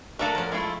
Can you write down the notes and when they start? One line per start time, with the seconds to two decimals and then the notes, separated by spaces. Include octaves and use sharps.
0.19 F#3 A3 D4 F#4 A4 A#4 E5 F5
0.35 F3 C#4
0.52 G#3 A3 E4 F4 C6 C#6